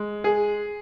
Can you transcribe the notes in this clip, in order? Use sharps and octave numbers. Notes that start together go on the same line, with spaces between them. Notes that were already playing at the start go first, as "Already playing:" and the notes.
Already playing: G#3
G#4